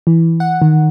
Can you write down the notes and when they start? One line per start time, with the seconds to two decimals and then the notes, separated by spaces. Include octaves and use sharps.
0.07 E3
0.40 F#5
0.62 D#3